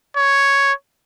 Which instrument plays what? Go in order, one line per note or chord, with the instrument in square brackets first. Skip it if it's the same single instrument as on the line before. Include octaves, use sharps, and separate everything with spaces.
[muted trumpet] C#5